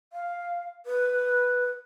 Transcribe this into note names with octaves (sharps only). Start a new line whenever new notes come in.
F5
B4